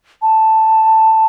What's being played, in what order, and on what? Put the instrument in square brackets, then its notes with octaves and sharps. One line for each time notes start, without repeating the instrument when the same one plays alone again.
[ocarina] A5